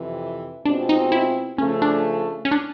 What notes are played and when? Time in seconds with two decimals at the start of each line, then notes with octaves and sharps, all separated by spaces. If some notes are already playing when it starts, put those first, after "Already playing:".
Already playing: F2 C3 E3
0.65 B2 G#3 C4 D4 F4
0.89 D#4
1.12 E4
1.58 C#3 F3 A3 C#4
1.82 D4
2.45 C#4
2.51 D4